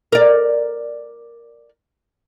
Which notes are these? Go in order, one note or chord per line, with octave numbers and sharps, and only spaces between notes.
A#4 D5